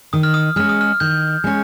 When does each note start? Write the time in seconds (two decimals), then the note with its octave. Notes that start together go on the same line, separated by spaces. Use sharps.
0.13 D#3 D#6
0.23 F6
0.34 D#6
0.56 G#3 C#4 F6
0.69 D#6
0.81 F6
1.00 D#3 G6
1.44 G#3 C#4